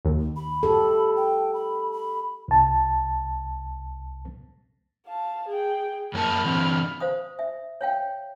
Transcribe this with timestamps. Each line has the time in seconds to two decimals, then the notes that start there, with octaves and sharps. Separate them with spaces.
0.05 D#2
0.36 B5
0.63 G4 A4
1.17 G5
1.54 B5
1.92 B5
2.48 C2 A5
5.06 F5 A5
5.48 G#4 G5
6.13 F#2 A#3 A5 B5 F6
6.44 D3 E3 C4
7.00 C5 F5 D#6
7.39 E5
7.81 C#5 F5 G5